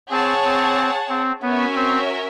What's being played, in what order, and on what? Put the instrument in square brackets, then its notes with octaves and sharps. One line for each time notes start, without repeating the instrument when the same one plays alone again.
[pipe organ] C4 [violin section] G#4 C#5 F#5 A5
[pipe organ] C4
C4
[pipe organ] B3 [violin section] C#4 F#4 A#4 C#5 E5
[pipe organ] C4